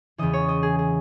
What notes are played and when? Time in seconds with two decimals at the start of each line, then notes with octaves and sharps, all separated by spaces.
0.18 E2 C#3 E3 D#5
0.33 C#5
0.48 D#5
0.63 G#4
0.79 G#4